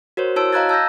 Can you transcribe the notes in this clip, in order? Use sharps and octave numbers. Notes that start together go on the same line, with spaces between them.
F#4 A#4 C5 C#5
E4 F#4 C#5 A5 E6 D7
D#5 F5 A#5 F#6 G#6 A6
A5 E6 G6 A#6